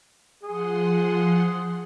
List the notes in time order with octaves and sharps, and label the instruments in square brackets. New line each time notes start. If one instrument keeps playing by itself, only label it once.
[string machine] F3 F#5 C6 [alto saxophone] G#4